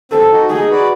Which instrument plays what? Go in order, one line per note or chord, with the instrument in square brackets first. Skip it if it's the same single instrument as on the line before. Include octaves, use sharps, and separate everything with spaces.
[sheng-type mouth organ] C4 [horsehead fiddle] A4
[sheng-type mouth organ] D#4 F#4
[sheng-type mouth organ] D#4 [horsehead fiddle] G#4
[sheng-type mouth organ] F#4 B4 D5